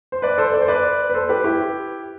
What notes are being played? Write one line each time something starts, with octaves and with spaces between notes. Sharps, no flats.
C5
B4 D5
A4 C5
D5
C5
B4 D5
B4
A4 C5
G4 B4
E4 G4